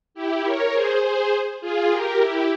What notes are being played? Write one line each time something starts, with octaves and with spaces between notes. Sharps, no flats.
E4 G4
A#4 C#5
G#4 C5
G#4 C5
F4 G#4
G4 A#4
E4 G4